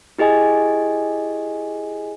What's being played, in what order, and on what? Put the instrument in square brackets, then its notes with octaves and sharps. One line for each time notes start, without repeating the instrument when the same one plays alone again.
[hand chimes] E4 G4 G#4 D#5 G#5